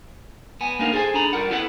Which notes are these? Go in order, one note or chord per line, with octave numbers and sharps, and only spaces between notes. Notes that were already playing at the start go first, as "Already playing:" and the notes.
B3 G#5
A#3 D4 D#4 A#4 F5
G#4 A4 C5 G#5
D4 D#4 G#4 A4 A#5 B5
G3 F4 A#4 F#5
B3 C4 E4 A4 B4 F#5